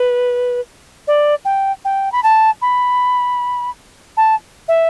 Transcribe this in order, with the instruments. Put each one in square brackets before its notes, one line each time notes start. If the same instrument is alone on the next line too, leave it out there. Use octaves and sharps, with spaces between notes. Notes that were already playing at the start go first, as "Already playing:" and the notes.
Already playing: [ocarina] B4
D5
G5
G5
B5
A5
B5
A5
E5